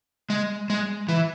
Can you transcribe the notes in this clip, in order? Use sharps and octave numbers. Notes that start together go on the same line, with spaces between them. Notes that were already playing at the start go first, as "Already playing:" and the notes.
G#3
G#3
E3